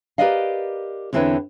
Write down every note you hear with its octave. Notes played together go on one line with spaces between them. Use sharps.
G4 A#4 B4 D5 D#5 F5
E2 D3 C4 E4 B4 C#5